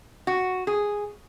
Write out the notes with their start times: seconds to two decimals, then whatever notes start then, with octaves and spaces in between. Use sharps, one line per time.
0.27 F#4
0.67 G#4